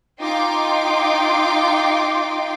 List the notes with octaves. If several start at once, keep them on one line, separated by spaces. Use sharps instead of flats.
D#4 F4 G5 C6 D6